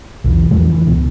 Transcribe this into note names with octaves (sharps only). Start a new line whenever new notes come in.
B1 E2 E3
A1 E2 F3 G#3
E3
C#2 B2